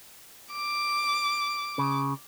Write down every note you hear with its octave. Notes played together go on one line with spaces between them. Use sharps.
D6
C#3